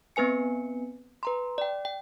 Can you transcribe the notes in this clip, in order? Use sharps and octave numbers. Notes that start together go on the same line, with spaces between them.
B3 C4 B4 G#5 C#7
B4 A#5 C6
D5 G5
G5